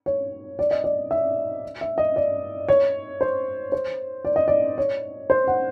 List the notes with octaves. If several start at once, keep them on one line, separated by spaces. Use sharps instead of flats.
C#5
D5
D#5
D5
E5
E5
D#5
D5
C#5
C5
C5
D5
D#5
D5
C#5
C5
F#5